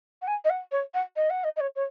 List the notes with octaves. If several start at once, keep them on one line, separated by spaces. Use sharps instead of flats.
F#5
G#5
D#5
F#5
C#5
F#5
D#5
F#5
D#5
D#5
C#5
C#5